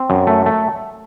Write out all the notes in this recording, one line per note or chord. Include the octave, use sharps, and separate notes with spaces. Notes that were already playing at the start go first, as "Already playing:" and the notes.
Already playing: C4
F#2
A3
A3